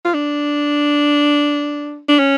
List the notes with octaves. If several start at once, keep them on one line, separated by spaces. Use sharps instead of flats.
F4
D4
D4
C#4